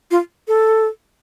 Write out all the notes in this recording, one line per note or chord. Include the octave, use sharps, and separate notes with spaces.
F4
A4